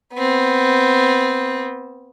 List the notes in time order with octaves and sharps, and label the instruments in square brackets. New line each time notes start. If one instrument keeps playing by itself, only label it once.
[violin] B3 C4